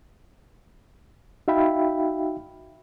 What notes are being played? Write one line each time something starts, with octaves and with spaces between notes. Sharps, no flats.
D#4 F#4 E5 F5 G5 B5